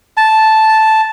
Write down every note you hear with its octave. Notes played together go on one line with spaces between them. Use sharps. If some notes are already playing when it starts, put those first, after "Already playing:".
A5